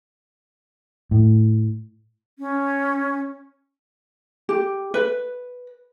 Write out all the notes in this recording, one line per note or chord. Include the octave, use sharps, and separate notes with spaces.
A2
C#4
G4
B4